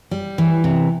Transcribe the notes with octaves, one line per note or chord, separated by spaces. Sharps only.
G3
E3
C3